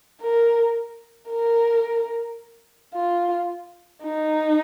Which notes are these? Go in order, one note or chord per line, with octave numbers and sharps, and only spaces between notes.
A#4
A#4
F4
D#4